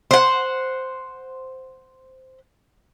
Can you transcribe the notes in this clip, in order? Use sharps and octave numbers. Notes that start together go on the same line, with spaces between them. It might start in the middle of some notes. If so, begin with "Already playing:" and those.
C5 F#5